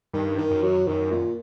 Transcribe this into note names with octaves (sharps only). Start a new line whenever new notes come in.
G2 D#3
D#3
F#2
F#3
F#2 D#3
A#2